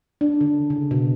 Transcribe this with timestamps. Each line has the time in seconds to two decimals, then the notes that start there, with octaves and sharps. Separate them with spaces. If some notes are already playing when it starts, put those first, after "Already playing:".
0.21 D4
0.41 D3
0.70 C#3
0.91 B2